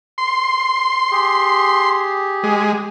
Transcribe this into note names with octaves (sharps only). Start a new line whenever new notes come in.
C6
G4 G#4
G#3